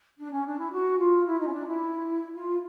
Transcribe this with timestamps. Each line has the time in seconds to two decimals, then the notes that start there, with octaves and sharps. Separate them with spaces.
0.18 D4
0.32 C#4
0.45 D4
0.59 E4
0.71 F#4
0.98 F4
1.26 E4
1.39 D#4
1.46 C#4
1.52 D4
1.65 E4
2.33 F4